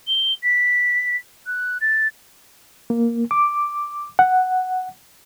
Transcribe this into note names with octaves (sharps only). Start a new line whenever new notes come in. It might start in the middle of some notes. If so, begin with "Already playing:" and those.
G7
B6
F#6
A6
A#3
D6
F#5